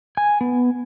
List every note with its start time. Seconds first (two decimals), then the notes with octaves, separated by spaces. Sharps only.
0.17 G#5
0.41 B3